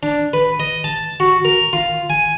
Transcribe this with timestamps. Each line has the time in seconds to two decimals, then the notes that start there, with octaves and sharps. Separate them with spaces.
0.03 D4
0.33 B4
0.60 D#5
0.84 A5
1.20 F#4
1.45 A#4
1.73 F4
2.10 G#5